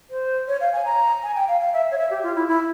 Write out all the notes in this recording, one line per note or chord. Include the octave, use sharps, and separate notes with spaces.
C5
C#5
F5
G#5
A#5
G#5
G5
F5
F5
E5
C#5
E5
G4
F4
E4
E4